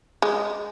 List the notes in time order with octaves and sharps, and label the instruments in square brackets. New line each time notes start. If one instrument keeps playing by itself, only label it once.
[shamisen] G#3